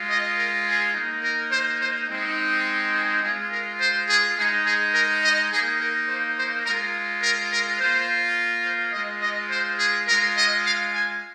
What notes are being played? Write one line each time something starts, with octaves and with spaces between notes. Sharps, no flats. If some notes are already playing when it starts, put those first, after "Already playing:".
Already playing: G#3 F4
D#5
A#4
G#4
A#3 D#4
A#4
C5
C5
G#3 C4 D#4
G#4
G#3 F4 G#4
A#4
C5
G#4
G#3 D#4 G#4
G#4
A#4
D#5
A#3 D#4 G#4
A#4
C5
C5
G#3 F4 A#4
A#4
A#4
A#3 F4 C5
C5
G#3 F4 D#5
D#5
C5
G#4
G#3 F4 A#4
D#5
F5
G#5